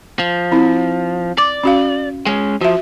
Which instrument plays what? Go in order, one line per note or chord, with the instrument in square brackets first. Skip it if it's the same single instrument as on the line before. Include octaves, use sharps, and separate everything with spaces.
[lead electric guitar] F3
[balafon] C4 E4
[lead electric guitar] D5 [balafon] D6
[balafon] C#4 F#4 F5
[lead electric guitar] G#3 C#4
[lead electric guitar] F3 [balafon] F#4 E5